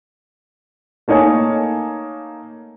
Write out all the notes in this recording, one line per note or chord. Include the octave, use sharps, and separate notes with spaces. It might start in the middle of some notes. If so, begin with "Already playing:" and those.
A3 A#3 D#4 C#5 G#5 A5